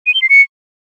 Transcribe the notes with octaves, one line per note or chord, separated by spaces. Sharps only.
D#7
G7
C7
C#7